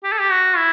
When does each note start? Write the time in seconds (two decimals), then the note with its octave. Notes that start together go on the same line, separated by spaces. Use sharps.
0.04 G4
0.12 A4
0.20 G4
0.31 F#4
0.57 E4